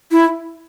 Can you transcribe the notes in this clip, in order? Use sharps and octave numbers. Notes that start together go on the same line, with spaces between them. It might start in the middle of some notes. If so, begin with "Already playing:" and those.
E4